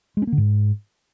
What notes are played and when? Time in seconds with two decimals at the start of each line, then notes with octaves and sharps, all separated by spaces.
0.17 G#3
0.22 C#4
0.27 A#3
0.32 D3
0.38 G#2